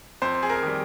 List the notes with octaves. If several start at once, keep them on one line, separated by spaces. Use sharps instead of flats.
F2 C5
G#4
A#4
D#3 G3